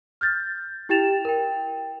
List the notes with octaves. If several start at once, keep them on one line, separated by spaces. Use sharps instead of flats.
F6 G6 A6
E4 G4 G5 A6 E7 F7
A#4 G5